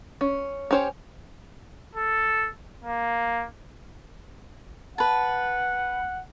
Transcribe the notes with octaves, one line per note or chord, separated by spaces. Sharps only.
C#4
C#4 G4 C5 C#5
A4
A#3
B4 F#5 A5